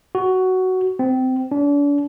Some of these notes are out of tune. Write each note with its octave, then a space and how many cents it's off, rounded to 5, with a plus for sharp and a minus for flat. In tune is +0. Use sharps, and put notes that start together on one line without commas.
F#4 +10
C4 -20
D4 -40